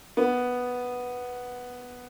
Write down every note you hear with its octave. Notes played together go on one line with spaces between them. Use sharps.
B3